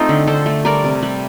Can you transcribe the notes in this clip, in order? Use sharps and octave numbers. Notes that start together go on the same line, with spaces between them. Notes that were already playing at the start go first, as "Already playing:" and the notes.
Already playing: A3 C4 D#4 F4
D3
D3 A4 C5
A3
G3 A#4 D5
C3
G3